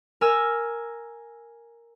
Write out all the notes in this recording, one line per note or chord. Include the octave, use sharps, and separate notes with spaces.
A#4 G#5 E6 F6